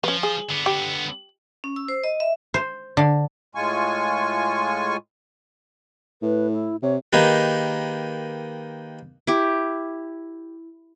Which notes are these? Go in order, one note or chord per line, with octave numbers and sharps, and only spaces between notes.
F3 C#4 B4
G#4
D3 B3
G4
C#4
E6
C5
D#5
E5
C5
D3
A2 G#3 F4 G#5 C#6
A2 B4
E4
C3 C#5
D#3 A#3 D#4 G4 G#4 B4
E4 G4